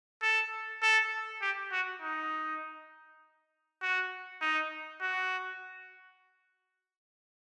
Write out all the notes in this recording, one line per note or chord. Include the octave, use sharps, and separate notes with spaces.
A4
A4
G4
F#4
D#4
F#4
D#4
F#4